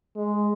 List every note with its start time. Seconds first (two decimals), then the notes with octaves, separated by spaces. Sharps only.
0.16 G#3